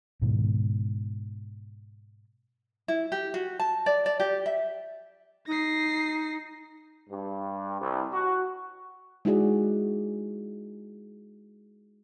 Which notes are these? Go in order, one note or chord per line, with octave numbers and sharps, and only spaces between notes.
G#2 B2 D#3
E4
G4
F#4
A5
D5
D5
G4
E5
D#4 A#6 C7
G2
C2
F#4
G#3 D#4 E4 F#4 G#4 D5